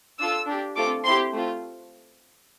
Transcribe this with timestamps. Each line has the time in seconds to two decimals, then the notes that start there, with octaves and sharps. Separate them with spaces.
0.19 D4 F4 A4 E6
0.47 D4 G4
0.76 A3 C4 F4 A4 D6
1.04 C4 E4 G4 C6
1.33 A3 C4 F4